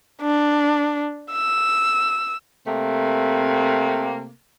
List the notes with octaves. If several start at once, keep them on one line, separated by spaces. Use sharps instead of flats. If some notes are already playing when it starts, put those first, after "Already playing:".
D4
E6
C3 A3 A#3